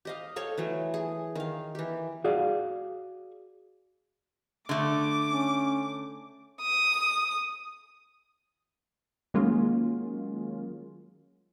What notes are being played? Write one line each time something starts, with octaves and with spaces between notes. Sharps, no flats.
G4 D#5 F5
A4 C#5 F5 G5
E3 F#3 A3
G#4
D#3 F5
E3 G4
F#4 G#4 D5 F5
D3 A3 D6
C#4
D#6
D#3 F#3 G#3 A#3 C#4 F4